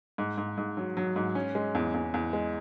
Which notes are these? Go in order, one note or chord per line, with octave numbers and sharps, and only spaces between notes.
G#2
G#2
G#2
F#3
F#3
G#2
C#4
G#3
E2
E2
E2
G#3